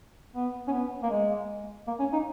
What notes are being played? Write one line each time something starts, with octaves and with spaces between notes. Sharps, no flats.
B3
C#4
B3
A#3
G#3
A#3
C#4
D#4